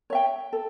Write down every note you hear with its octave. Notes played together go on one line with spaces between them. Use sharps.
C#5 E5 G5
A4